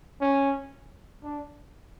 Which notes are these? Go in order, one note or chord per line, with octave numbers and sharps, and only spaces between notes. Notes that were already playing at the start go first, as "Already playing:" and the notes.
C#4
D4